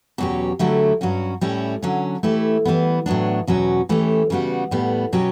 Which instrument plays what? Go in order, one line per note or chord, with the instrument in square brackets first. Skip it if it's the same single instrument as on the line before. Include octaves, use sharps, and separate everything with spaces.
[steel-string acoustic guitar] E2 B2 F#3 C#4 G4
D3 F#3 A3 E4 G4
G2 F#3 C#4 F#4
A2 G3 C#4 E4
D3 F#3 C#4
E3 A3 E4 G4
E3 G3 B3
A2 F#3 B3 D4
E2 B2 F#3 C#4
E3 A3 C#4 G4
C#3 G3 B3 F#4
A2 G3 B3
B2 F#3 C#4 G4